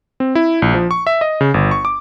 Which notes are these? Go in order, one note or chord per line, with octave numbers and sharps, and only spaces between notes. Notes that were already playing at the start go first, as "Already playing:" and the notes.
C4
E4
A#1
F3
C#6
E5
D#5
C#3
G1
C#6
D6